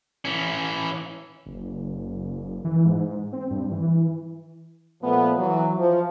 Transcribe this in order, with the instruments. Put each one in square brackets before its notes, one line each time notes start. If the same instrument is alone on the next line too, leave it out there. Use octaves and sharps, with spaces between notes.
[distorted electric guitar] E3 C#4
[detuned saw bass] F#1
E3
G#2
C4
G2
E3
[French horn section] A#2 F3 A3 B3
E3 F#3
F3